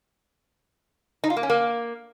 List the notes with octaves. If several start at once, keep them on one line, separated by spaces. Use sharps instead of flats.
D#4
F4
A#3
C#4
A#3